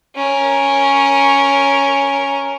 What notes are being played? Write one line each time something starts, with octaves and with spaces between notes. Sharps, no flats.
C#4 A#4